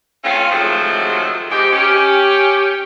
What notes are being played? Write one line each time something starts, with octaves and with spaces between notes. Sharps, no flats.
A3 C4 C#4 F4
C3 D#3 F3 F#3 G#3 A3
G#2 G4
C#4 G4